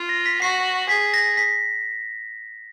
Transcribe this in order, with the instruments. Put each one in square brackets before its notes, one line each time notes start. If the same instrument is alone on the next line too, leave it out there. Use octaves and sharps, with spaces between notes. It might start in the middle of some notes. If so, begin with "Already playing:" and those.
Already playing: [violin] F4
[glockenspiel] A#6
B6
[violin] F#4 [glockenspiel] C7
[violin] G#4 [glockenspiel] B6
[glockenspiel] A#6
B6